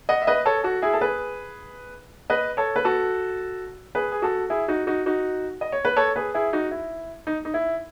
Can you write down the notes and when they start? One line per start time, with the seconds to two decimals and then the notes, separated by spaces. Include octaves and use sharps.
0.09 D#5 F#5
0.22 E5
0.27 B4 D#5
0.46 A4 C#5
0.64 F#4 A4
0.82 E4 G#4
0.93 A4
1.01 G#4 B4
2.30 B4 D#5
2.57 A4 C#5
2.76 B4
2.85 F#4 A4
3.95 G#4 B4
4.12 G#4
4.22 F#4 A4
4.50 E4 G#4
4.68 D#4 F#4
4.87 D#4 F#4
5.06 D#4 F#4
5.61 D#5
5.72 C#5
5.85 B4
5.97 A4 C#5
6.16 G#4 B4
6.34 E4 G#4
6.53 D#4 F#4
6.71 E4
7.27 D#4
7.45 D#4
7.54 E4